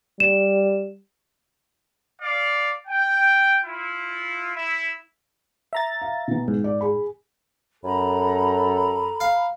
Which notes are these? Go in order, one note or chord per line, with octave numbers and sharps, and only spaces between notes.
G3 E7
D5 F5
G5
E4 F4
E4 E5
E5 A#5 A6
F5
B2 E3 B3
G#2
D5
G#4 B5
F#2 A4 A#5 B5
F5